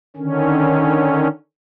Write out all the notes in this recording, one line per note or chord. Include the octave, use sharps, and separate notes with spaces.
D3 D#3 C#4